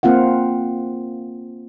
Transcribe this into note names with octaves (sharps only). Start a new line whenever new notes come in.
A#3 C4 F4 F5 F#5